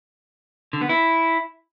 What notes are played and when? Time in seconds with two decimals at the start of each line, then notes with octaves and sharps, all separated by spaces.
0.73 D3
0.81 B3
0.89 E4